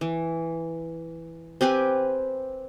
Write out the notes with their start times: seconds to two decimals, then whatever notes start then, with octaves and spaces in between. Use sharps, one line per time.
0.01 E3
1.61 C4 G4 B4 G#5